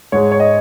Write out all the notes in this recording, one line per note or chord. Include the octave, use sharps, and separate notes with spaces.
G#2 G#3 C#5
C#5
D#5